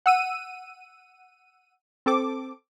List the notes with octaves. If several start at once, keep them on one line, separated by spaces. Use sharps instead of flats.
F#5 E6 D#7
C4 A4 D6